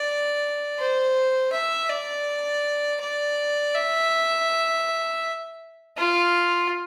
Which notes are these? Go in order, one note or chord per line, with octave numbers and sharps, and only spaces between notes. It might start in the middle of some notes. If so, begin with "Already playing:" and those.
Already playing: D5
C5
E5
D5
D5
E5
F4